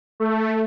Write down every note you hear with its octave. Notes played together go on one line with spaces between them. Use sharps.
A3